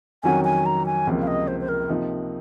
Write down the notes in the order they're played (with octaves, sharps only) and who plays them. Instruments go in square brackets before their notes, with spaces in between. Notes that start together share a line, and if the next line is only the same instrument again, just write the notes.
[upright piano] F2 D#3 F#3 C#4 F#4 [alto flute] G#5
[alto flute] G#5
A#5
G#5
[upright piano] C#2 C3 F3 A#3
[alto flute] F5
D#5
C5
C5
A#4
[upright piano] C3 F3 A#3 D#4